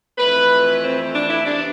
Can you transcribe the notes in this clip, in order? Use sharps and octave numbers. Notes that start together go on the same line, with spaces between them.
F2 E3 A3 B4
C4
D4
E4
C3 E3 B3 D4